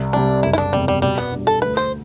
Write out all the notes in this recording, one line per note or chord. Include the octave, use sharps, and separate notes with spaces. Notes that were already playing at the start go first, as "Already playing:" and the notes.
Already playing: C2
C3 G3 D4
F#1 E4
E4
D4
E2 C3 G3
G3
B2 G3
B3
G3 D4
A4
D2 B4
C5